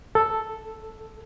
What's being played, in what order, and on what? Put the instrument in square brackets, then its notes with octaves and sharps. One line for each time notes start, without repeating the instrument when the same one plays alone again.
[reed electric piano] A4